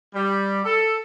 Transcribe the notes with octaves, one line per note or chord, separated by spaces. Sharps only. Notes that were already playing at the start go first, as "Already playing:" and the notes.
G3
A4